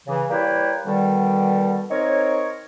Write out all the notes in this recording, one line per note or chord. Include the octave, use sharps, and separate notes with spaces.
C#3 E3
G3 A#3 E4 B4 C#5 G5
B2 D3 D#3 G3
C4 D#4 A#4 C#5